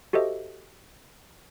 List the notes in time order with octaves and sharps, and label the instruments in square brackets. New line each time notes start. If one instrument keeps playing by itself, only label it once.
[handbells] F#4 G4 A4 C5 D#5 E5